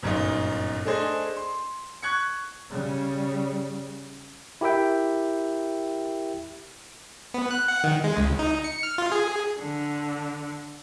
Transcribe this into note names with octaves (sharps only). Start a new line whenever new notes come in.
G1 F#2 A#2 D#4
A3 D4 G#4 C5 D#5
C6
C#6 F#6 G#6 C#7
C#3 G3
E4 G4 A#4 E5 G5
B3
F#6
F#5
D#3
G#3
C#2
D#4
C#7
F6
F4
G#4
D3